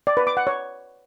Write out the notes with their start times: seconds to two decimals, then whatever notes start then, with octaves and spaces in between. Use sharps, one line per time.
0.07 D5
0.17 B4
0.27 D6
0.37 F#5
0.47 C#5